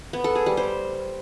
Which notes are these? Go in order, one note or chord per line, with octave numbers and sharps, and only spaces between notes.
B3
A4
G#4
G3
C5